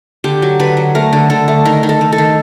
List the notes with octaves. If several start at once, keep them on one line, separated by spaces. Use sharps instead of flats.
D3 G4
F#3
D3 B4
F#3
A3 A#4
D3
D3 A4
A3
D#3 A#4
D#3
A4
D#3
A4
D#3